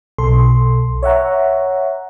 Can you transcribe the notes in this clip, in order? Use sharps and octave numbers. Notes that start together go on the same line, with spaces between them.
B1 A4 C6
C#5 E5 F#5 A#5